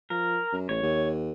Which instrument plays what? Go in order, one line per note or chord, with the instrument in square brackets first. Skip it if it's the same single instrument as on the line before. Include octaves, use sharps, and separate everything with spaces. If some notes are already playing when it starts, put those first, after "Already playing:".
[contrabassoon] F3 [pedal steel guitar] A#4
[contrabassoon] F#2
[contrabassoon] A1 [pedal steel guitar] C#5
[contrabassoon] D#2